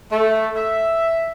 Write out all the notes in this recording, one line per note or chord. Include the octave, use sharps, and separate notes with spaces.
A3
E5